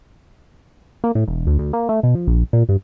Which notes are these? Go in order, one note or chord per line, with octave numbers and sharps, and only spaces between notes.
A#3
A2
E1
D2
D2
A#3
A3
B2
F2
A#1
A#2
G2